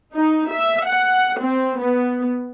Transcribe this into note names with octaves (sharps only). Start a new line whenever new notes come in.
D#4
E5
F#5
C4
B3